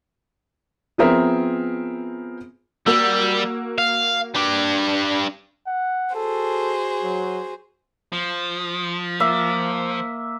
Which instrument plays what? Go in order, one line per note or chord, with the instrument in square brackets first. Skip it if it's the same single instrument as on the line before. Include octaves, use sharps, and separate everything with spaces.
[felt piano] F3 B3 C4 G#4 A#4 E5
[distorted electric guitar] G3 [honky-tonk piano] A#3 F#4 E6
[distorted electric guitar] F5
G3 D4
[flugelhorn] F#5
[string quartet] F#4 G#4 C5 [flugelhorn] A4
[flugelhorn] F#3
[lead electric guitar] F3
[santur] A#3 E5